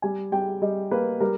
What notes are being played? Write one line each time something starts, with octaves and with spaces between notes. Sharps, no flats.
G3 G#5
G3 G5
G3 D#5
A#3 B4
G3 A#4